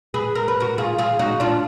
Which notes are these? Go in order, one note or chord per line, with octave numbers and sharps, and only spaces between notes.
G#4 B4
A#4
B4
F#4 A#4
F4 G#4
F4 G#4
D#4 F#4
D4 F4